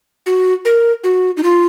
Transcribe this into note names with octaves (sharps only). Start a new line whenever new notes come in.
F#4
A#4
F#4
D#4
F4